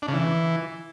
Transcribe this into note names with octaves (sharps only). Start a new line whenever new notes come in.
D4
C#3
E3